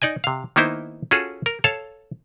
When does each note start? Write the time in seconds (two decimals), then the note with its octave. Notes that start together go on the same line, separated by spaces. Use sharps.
0.02 D#4 D5 D#5 G#5
0.24 C3 F5
0.56 D#3 A#3 B3 D#4 E4 C5
1.11 C#4 F4 F#4 G#4 A4
1.46 A#4
1.64 A4 C#5 F5 A5